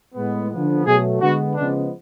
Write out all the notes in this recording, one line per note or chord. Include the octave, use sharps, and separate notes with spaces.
A2 G#3 B3
D3 F3 B3
B2 F#3 A3 G#4
D3 G#3 B3 F#4
C#3 F3 G#3 B3 D4